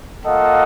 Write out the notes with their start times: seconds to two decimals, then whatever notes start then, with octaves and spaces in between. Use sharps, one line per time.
0.24 A#3 F4 A4 D#5 F#5